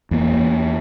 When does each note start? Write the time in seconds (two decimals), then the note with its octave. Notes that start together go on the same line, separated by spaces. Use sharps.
0.11 E2 A#3